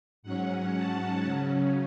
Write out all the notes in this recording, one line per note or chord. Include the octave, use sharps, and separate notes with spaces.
G#2 F#3 C#4 F#5
A5
C#3 F#3 C#4